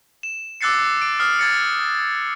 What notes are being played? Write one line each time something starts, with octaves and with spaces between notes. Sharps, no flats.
E7
D6 E6 F#6 A6 C7 C#7
D7
D#6 F6 C7
G#6 A6 C#7